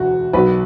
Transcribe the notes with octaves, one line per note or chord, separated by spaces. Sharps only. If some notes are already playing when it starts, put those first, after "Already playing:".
Already playing: E1 D2 F#4
B1 B2 F#3 B4